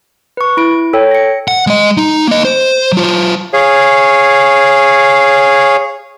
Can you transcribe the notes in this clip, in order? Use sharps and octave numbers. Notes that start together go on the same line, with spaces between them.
B4 C#6
E4 D7
A4 C#5 G5
A#6 C#7
F#5
G#3 D#5
D#4
A#3 D#5
C5
F#3 F4
G#4 C#5 F5